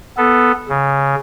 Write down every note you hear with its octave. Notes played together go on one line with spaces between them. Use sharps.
B3 A4
C#3